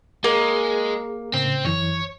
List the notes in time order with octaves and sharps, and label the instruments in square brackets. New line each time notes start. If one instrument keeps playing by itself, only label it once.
[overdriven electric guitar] G#3 [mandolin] A#3 [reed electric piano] G#4
[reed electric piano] A2 C#3 [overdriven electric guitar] C4
[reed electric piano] F#2 E3 [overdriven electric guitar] C#5